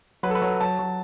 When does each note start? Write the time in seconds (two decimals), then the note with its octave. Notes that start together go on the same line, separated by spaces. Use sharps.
0.23 F#3 B4
0.30 A4
0.35 B4
0.42 F#3
0.61 F#3 A5
0.79 F#3